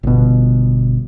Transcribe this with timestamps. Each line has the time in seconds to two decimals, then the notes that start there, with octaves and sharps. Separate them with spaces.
0.03 G1 B2